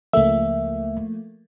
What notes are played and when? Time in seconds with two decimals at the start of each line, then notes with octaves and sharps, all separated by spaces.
0.13 C#2 F3 A3 A#3 E5